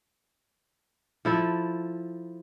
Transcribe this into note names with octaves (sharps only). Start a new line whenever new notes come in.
F3 E4 A4